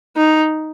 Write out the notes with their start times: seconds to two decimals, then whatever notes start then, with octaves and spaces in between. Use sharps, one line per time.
0.17 D#4